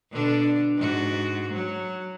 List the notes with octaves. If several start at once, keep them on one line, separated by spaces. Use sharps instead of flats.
B2 D3 D4
G#2 F#4
F#3